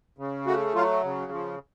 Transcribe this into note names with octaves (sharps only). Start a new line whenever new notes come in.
C#3
A3 F#4
F#3 F4
C#3
F3